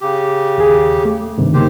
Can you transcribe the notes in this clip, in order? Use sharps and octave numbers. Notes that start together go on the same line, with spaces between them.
C#3 G4
D#2 G#4
A3
G2 C3 D#3
C#3 A#3 D#4 G4 C5